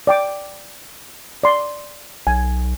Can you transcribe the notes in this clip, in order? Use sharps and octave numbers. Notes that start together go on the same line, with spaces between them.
D5 G5 D6
D5 C6
B1 G#5